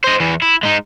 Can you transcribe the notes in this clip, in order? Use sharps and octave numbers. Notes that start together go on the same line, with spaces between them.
C5 D#5
E2 E3
E4
G#3 D#4